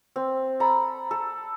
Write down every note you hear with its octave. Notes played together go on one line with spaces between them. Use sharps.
C4
A4 A#5 B5
A4